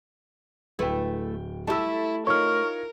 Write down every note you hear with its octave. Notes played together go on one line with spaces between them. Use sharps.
D1 A3 E4 B4 G5
A3 E4 G4 A5 E6
D#4 F4 A#4 C#5 C#6 F6